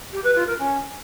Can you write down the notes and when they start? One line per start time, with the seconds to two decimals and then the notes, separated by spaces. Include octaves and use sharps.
0.12 G4
0.23 B4
0.35 F4
0.47 A#4
0.58 C#4